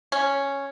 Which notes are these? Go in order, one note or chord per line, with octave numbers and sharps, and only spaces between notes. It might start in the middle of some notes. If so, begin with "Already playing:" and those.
C#4